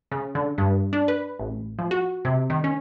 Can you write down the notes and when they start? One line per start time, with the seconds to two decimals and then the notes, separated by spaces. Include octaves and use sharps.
0.12 C#3
0.35 D3
0.58 G2
0.93 D4
1.08 B4
1.39 A1
1.79 F3
1.91 F#4
2.25 C3
2.50 D#3
2.64 C#4